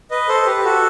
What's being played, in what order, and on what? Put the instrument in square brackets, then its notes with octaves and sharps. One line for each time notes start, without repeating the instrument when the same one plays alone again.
[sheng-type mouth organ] B4 D#5
A4 C5
G4 B4
F#4 A4